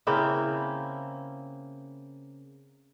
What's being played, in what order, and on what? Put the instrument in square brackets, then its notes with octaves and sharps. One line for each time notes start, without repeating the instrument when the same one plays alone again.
[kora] C#3 A#3 C4 E4